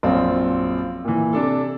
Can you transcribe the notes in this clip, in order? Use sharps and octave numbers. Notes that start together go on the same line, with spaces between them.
A#1 F#2 C4 F4
A#2 E3
C3 D4 A4